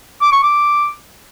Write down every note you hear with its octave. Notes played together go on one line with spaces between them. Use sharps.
D6
C#6
D6